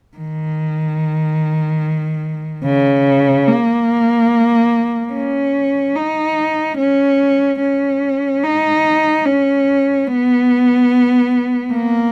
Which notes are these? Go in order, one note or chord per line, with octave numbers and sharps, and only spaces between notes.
D#3
C#3
A#3
C#4
D#4
C#4
C#4
D#4
C#4
B3
A#3